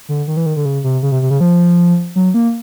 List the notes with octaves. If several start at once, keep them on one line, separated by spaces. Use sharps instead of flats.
D3
D#3
E3
D#3
D3
C#3
C3
C#3
C3
C3
C#3
F3
F#3
A#3